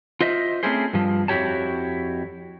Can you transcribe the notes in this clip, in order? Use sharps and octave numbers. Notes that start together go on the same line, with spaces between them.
F4 C5 D#5 E5
A3 C4 C#4 E4 G#4 C5
G2 F3
F2 E4 F#4 G4 C#5 A5